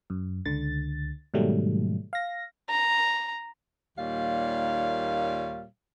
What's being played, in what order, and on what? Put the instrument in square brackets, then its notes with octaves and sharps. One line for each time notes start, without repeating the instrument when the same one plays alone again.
[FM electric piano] F#2
C#2 D3 A6
G#2 B2 D#3 F#3 G3 A3
F5 A#6
[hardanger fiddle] A#5
[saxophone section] D#2 A#2 G3 C#5 F5